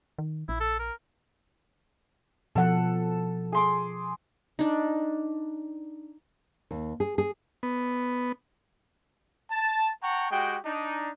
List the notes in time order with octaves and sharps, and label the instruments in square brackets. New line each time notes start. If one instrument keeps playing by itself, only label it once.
[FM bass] D#3
[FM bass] A#1 [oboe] E4
[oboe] A4
A#4
[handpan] B2 F3 F#5 [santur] A4
[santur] G#4 C6 D6
[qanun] D4 D#4
[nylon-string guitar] D#2
G#4
G#4
[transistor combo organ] B3
[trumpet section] A5
F#5 G5 A5 A#5 C#6
G#3 F#4 G4 G5
D4 D#4